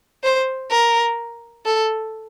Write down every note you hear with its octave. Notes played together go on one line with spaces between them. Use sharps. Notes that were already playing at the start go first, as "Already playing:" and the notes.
C5
A#4
A4